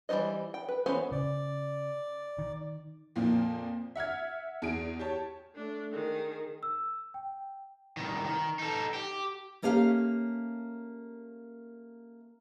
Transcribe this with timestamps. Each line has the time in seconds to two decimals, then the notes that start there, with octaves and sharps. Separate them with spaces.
0.09 E3 G3 F4 C5 D#5
0.54 G5
0.68 B4
0.86 E3 B3 C#4 C5
1.12 C#3 D5
2.38 D#3
3.16 F2 A#2 F3 A#3
3.96 E5 F#5 F6 G#6
4.62 E2 G#4 D7
4.99 G4 C#5 A5
5.55 A3 D4
5.92 D#3 G#4
6.63 E6
7.14 G5
7.97 C2 D#3
8.24 D#3
8.59 D#4 A4
8.94 G4
9.62 A3 A#3 C#4 G4 F5